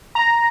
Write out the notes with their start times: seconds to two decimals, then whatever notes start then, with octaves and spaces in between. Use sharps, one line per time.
0.15 A#5